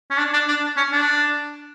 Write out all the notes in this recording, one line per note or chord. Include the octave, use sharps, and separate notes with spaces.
C#4
D4
D4
D4
C#4
D4